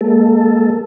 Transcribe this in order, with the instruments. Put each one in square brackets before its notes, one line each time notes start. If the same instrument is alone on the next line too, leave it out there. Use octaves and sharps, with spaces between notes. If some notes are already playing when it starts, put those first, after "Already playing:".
[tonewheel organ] G#3 A#3 A4